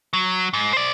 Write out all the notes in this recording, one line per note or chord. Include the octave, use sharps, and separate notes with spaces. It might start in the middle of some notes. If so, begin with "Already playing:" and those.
F#3
G#2
C5 D5